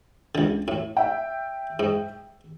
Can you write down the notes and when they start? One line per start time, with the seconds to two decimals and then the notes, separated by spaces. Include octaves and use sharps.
0.35 C#2 D3
0.68 A2
0.97 E5 G5
1.79 G#2